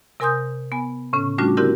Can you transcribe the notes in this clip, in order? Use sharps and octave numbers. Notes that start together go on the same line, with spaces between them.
C3 A#4 G#5 C6 D#6 G6
B3 G#5
A2 C#3 C#4
G3 A3 C#4 D4 F4 F#4
D3 C4 E4 F#4 G4 A#4